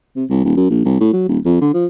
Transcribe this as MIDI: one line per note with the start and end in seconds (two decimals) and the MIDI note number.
0.16 0.25 48
0.30 0.43 36
0.45 0.53 27
0.57 0.69 42
0.70 0.83 34
0.85 0.99 36
1.00 1.13 45
1.13 1.26 54
1.29 1.39 27
1.45 1.59 41
1.61 1.71 50
1.74 1.86 53